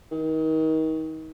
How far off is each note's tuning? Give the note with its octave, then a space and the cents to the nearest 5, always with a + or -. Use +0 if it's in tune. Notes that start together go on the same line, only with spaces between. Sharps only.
D#3 +30